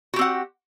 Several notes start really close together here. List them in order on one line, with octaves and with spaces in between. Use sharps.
F#4 G4 C4 F#5